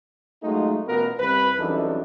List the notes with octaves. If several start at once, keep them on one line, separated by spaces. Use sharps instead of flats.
F#3 G#3 A3 D#4 F4 F#4
A1 B2 B3 F4 A#4 B4
C2 B4
C2 F#2 E3 D4 D#4 A4